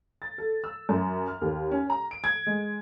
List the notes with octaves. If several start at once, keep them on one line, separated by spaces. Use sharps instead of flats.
A6
A4
E6
F#2
F6
D#2
C#4
A#5
D7
G#6
G#3